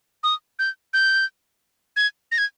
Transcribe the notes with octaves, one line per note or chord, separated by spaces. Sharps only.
D#6
G6
G6
G#6
A#6
G#6